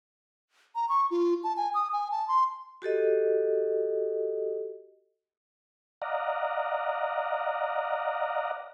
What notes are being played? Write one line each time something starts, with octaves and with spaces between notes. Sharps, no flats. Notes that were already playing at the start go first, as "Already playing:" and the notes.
A#5
C#6
F4
A5
G#5
D#6
G#5
A5
C6
F#4 G4 A4 D#5
D5 D#5 F5 F#5 A#5